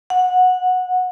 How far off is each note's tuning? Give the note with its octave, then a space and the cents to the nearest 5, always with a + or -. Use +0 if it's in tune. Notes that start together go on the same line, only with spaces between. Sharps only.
F#5 -15